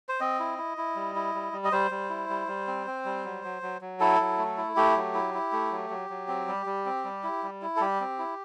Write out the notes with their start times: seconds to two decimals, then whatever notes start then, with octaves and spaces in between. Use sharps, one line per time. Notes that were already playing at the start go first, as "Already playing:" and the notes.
0.09 C5
0.20 C4 D#5
0.40 E4
0.58 E4
0.78 E4
0.96 G3
1.15 E4
1.35 G3
1.53 G3
1.64 D#5
1.72 G3 C5
1.91 G3
2.10 E4
2.29 G3
2.48 G3
2.67 C4
2.87 C4
3.05 G3
3.24 F#3
3.44 F#3
3.62 F#3
3.81 F#3
4.00 E4 A4
4.20 F#3
4.38 A3
4.57 E4
4.76 A3 G4
4.96 F#3
5.15 E4
5.34 E4
5.52 A3
5.71 F#3
5.90 F#3
6.10 F#3
6.28 C4
6.48 G3
6.66 G3
6.86 C4
7.04 G3
7.23 E4
7.43 G3
7.62 E4
7.76 A4
7.81 G3 G4
8.00 C4
8.19 E4